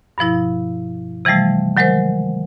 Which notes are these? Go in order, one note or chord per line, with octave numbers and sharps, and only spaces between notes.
G2 B2 F3 E4
C3 E3 F3 G3 A3
D#3 F#3 G#3 A#4 C5